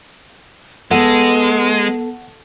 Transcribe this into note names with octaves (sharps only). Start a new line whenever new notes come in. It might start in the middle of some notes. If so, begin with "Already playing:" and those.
G#3 B3 A4 F#5